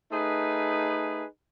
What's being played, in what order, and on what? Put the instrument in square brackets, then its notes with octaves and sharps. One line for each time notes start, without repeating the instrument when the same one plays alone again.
[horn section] A3 D#4 G#4 B4